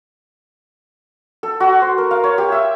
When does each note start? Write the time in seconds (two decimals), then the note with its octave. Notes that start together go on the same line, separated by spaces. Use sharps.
1.43 A4
1.60 F#4
1.82 C5
1.98 A#4
2.11 F5
2.24 C#5
2.38 G4
2.52 E5